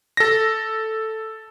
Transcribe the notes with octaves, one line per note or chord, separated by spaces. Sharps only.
A4 A#6